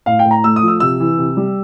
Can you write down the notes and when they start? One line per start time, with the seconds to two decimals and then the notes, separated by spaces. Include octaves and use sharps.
0.06 A2 F5
0.19 G5
0.25 A2
0.31 A#5
0.44 A3 E6
0.56 D#6
0.62 F3
0.68 E6
0.80 C3 E6
1.00 E3
1.18 C3
1.37 G3